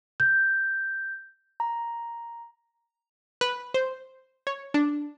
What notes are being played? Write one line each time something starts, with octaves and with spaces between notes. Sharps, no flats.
G6
A#5
B4
C5
C#5
D4